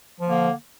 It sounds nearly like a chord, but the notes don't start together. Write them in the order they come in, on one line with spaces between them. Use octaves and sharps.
F3 A#3 D3